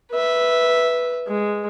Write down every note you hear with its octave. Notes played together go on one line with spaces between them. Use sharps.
B4 E5
G#3